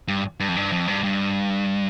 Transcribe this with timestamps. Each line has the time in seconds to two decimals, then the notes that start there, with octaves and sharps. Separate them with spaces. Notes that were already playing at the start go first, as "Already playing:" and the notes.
0.08 G2
0.40 G2
0.48 F2
0.56 G2
0.72 F2
0.87 G2
1.04 G2